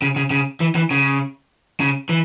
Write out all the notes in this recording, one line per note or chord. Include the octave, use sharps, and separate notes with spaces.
C#3
C#3
C#3
E3
E3
C#3
C#3
E3